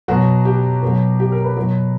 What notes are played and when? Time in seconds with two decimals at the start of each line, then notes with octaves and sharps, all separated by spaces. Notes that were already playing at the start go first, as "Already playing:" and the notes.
0.08 B2 F#3 F#4
0.45 G4
0.82 B2 F#3
1.20 G4
1.32 A#4
1.44 B4
1.57 B2 F#3